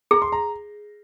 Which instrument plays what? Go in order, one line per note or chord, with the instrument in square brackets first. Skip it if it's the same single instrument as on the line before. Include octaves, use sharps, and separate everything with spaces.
[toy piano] G#4 [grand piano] A#5
[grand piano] C6
A#5